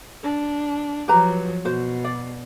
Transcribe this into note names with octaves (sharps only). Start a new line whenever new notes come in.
D4
F3 F#3 G4 B4 A#5
B2 F#4 C5
D5